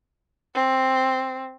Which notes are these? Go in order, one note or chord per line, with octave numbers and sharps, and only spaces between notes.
C4